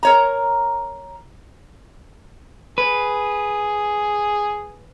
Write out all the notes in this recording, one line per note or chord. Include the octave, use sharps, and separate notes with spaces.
A#4 C#5 A#5
G#4 B4